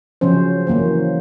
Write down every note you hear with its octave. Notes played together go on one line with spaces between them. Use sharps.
C#3 F3 F#3 C#4 C5
E3 F#3 A#3 C#4 C5